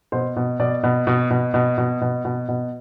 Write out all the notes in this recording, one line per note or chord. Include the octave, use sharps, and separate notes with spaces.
B2 C5
B2
B2 D5
B2
B2
B2
B2
B2
B2
B2
B2